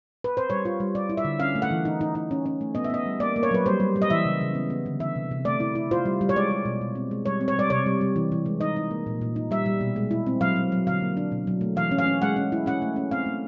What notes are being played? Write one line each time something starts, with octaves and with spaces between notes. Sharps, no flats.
B4
C5
G3 C#5
F4
G3
G3 D5
E4
E5
D3
C#4 F5
A3
F#5
E3
D#4
D#4
D#4
C#4
C#4
A3
B3 D#5
E5
B3 D#5
G3
A#3 D5
A#3
C#5
F#3 B4
G3 C5
G3
G3
D#5
E3 E5
C#3
C#3
B3
B3
D3
E3 E5
C3
C3
A3 D5
E4
E4
F4 C5
G3
G3
C#5
G#3 D5
G#3
B2
B2
C4
G#3
G3 C#5
C4
C#5
G3 D5
C3 C#5
G3
G3
E3
E3
G#3
D#4 D#5
D#4
A#3
A#2
A#2
D#4
G3 E5
G3
B2
G#3
E4
C4
F#3 F5
F#3
F#3
D3 F5
A#3
D4
B2
F#3
A3
E3 F5
C#4
F5
C#4
G#3 F#5
C#4
E4
C#4 F#5
A3
C#4
C4 F5
A3